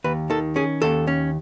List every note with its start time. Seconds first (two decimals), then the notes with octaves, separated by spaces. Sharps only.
0.04 D#2 B4
0.30 D#3 A4
0.56 C#4 G#4
0.82 D#2 A4
1.07 C#4